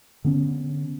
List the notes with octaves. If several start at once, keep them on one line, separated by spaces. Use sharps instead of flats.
D3 B3 C#4